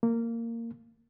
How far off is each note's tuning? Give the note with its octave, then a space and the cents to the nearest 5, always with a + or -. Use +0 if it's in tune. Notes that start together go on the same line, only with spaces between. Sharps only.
A#3 -15